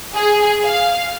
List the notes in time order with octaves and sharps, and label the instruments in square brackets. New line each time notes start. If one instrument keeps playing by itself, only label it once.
[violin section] G#4
F5